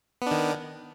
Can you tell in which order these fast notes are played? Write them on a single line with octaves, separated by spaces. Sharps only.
B3 D4 D#3